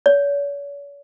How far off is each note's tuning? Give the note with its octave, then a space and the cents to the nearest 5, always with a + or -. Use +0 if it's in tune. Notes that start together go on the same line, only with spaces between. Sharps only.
C#5 +40